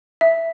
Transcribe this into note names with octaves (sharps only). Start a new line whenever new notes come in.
E5